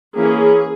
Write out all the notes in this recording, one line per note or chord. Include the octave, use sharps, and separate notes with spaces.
E3 A#3 C#4 G#4